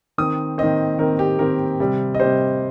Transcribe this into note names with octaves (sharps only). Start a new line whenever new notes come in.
D#3 C4 D#6
D#3 C4 D#5
D#3 C4 A#4
G4
D#3 C4 A#4
C3 G3 C4
D#5
C3 G3 C4 C5